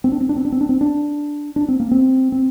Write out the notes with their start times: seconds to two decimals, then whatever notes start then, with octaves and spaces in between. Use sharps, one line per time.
0.04 C4
0.12 D4
0.21 C4
0.29 D4
0.36 C4
0.45 D4
0.52 C4
0.61 D4
0.69 C4
0.81 D4
1.56 D4
1.68 C4
1.80 A#3
1.91 C4
2.32 C4